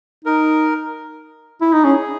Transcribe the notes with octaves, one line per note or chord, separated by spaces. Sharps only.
D#4 A#4
E4
D#4
C#4 G#4